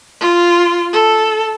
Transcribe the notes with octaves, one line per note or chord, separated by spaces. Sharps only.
F4
A4